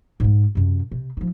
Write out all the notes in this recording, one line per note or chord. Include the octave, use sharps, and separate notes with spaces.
G#2 G#3
F#2 C3
C3
F3 D#4